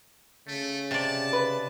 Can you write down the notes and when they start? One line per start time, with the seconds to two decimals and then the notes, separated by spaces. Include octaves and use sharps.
0.48 C#3 A3
0.91 C3 D5 A5
1.33 B4